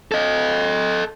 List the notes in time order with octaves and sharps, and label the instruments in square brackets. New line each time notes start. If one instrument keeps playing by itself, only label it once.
[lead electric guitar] A4 D#5